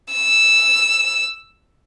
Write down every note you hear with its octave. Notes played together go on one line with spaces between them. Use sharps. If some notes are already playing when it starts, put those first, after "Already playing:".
E6